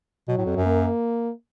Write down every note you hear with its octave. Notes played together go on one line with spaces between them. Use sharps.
B2 F#3
A2
F2
F#2
A#3